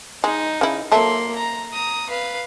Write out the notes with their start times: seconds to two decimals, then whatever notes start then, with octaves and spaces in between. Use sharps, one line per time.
0.24 G#3 D#4
0.61 C#3 E4
0.92 F#3 A#3 A4 E5 C6
1.35 A#5
1.72 A#5 D#6
2.09 B4 F5